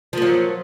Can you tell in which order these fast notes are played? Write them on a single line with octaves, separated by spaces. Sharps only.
F3 A#3 F#3